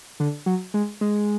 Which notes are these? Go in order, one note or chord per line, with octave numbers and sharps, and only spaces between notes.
D3
F#3
G#3
G#3